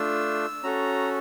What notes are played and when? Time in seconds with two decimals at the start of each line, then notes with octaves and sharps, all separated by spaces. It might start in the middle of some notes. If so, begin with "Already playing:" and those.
Already playing: A3 D4 F4 E6
0.63 C#4 F#4 A4 A#5